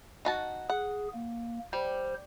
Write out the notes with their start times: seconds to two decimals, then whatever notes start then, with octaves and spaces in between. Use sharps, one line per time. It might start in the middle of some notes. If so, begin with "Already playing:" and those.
0.25 D#4 F#4 A5
0.70 G#4 F#5
1.14 A#3
1.73 G3 C5